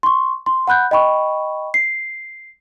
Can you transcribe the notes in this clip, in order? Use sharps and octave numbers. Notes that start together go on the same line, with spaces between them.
C6 C#6
C6
F#5 B5 F#6 G6
D#5 G5 B5 C#6
C7